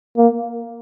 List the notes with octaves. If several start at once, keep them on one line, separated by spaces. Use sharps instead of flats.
A#3